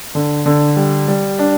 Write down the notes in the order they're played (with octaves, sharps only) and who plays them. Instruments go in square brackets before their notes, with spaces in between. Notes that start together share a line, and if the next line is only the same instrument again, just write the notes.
[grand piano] D3
D3
G3
G3
D4